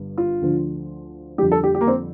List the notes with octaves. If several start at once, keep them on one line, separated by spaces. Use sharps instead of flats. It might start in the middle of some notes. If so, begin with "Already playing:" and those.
Already playing: G1 G2
F4
D2 D3 F3
F2 D3 G3 G4
A4
G4
G4
A#3
C4